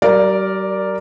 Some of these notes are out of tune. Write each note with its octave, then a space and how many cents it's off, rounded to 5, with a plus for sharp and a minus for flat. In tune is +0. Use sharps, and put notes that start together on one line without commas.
G3 -40 A#4 +0 D5 +0